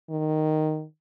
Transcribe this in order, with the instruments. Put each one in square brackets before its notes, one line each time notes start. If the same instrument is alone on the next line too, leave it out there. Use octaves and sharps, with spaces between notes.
[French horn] D#3